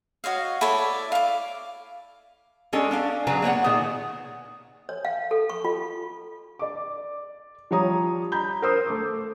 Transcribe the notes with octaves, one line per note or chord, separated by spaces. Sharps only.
F#4 C#5 D#5 F5
E4 A4 C#5 D5
F5 D6
G#3 C#4 D4 A4
C#4 D4 F5
C#3 F#3 G#4 B4 G#5 A#5
A#3 B3 C#5 F#5
A#2 D#3 G#4
C#5
F5
A4
C#6
F4
D5 D6
F3 G3 C#5 A#5 D#6
A#5 B5 G6
A#4 C5 C6 D#6 E6
A3 D6